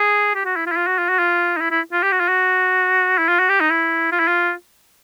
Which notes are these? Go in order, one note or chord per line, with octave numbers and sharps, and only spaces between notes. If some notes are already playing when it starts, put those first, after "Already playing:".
Already playing: G#4
G4
F#4
E4
F4
E4
F4
F#4
F4
F#4
F4
D#4
E4
E4
F4
G4
F#4
F4
F#4
E4
F4
F#4
G4
D#4
E4
F4
E4
F4